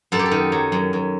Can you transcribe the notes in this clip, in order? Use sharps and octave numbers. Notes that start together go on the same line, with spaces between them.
F#2 A4
G4
A4
D#3
F#3
F#2
F#2